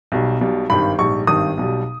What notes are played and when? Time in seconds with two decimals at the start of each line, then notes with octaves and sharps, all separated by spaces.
0.12 B1 B2 G3
0.41 B1 B2 G3
0.70 G#1 G2 D#3 B5
0.99 A#1 G#2 G3 C#6
1.27 G#1 G2 D#3 D#6
1.57 B1 B2 G3